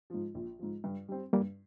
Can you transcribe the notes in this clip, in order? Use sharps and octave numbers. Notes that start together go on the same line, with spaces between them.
G#2 F3
A#1
G#2 F3
G2
G3 C4
G2 G3 A#3